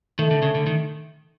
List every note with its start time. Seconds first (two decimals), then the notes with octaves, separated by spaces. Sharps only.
0.19 D#3 A3
0.31 D3
0.42 C#3
0.55 D3
0.66 D#3